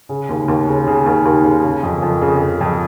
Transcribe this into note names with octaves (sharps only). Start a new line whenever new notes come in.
C#3
D#2
D#2
C#3
C#3
D#2
D#2
C#3
C#3
F2
F2
C#3
C#3
F2